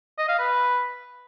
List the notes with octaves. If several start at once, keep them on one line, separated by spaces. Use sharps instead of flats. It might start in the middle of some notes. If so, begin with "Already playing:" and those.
D#5
F5
B4